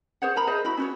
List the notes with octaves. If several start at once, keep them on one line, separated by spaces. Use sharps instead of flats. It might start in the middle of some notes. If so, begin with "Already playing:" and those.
G#4 C5 C#5 F#5
A#4 A#5 B5
G#4 C5 D#5 E5
E4 F#4 B5
C#4 F#4 C#5